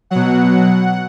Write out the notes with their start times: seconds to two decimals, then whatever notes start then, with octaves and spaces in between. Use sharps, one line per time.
0.10 B2 F#3 F#5